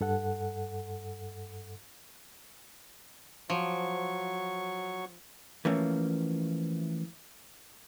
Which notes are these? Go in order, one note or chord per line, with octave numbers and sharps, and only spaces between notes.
G2 A4 F#5
F3 F#3 C#6
E3 F3 A3 A#3 C#4